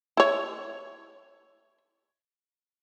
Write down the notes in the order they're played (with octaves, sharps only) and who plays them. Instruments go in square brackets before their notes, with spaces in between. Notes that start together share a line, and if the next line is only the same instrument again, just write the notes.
[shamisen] E4 C#5